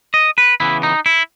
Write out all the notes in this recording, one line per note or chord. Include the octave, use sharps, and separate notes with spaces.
D#5
B4
C#3 E3 B3 E4
D#4
E4